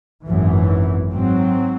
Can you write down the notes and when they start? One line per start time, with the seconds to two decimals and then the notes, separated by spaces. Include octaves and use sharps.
0.25 G#1 F#2 E3
1.11 G#2 F#3 C4